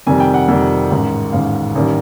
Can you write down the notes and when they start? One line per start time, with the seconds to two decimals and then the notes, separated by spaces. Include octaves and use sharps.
0.07 F2 C3 D#3 G3 G#5
0.20 G5
0.34 F#5
0.48 F2 C3 D#3 G3
0.91 A1 G#2 D#3
1.33 A1 G#2 D#3 F5
1.75 A1 D#3 G3